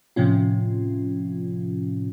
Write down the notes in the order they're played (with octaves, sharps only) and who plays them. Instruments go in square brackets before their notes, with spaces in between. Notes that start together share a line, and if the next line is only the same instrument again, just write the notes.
[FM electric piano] A2 C3 F3 C#4 F4